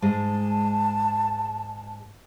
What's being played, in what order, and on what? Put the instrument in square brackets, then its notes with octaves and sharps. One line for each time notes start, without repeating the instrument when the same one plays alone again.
[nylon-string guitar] G#2 G#3 [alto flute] A5